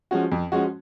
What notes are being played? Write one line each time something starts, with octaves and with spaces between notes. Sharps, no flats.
F3 G#3 C#4 F#4
F2
F3 G#3 C#4 F#4